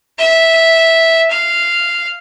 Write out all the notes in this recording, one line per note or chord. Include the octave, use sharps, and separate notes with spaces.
E5
F5